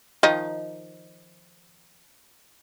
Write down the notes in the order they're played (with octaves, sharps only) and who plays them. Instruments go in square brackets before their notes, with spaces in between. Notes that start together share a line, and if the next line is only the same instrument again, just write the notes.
[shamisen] D#3 F3 D#4